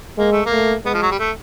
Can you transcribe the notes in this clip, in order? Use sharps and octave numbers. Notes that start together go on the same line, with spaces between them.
G#3 A#3
A3
A#3
A3
G#3 B3
F3
F#3
G3
A3